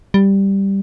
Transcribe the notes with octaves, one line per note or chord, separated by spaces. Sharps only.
G3